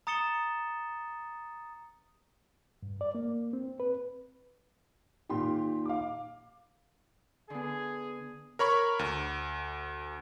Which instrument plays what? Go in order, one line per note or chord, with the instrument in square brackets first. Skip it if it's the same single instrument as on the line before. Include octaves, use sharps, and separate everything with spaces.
[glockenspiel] A#5 D#6 A6 C#7 E7 G7
[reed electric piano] G2
D5
A#3
C4
B4
[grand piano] A#2 D#3 [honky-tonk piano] G4 C6
[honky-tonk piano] F5 D6
[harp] D3 B3 [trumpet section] G#4
[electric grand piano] A#4 C#5 B5 C#6
D2